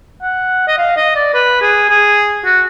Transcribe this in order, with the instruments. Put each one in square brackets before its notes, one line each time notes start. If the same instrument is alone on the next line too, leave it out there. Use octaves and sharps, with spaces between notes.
[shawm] F#5
D#5
F5
D#5
D5
B4
G#4
G#4
F#4